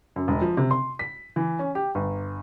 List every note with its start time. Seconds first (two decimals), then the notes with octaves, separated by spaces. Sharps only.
0.16 F#2
0.28 E1
0.41 F3
0.57 C3
0.71 C6
0.99 B6
1.36 E3
1.59 C#4
1.75 G4
1.95 G1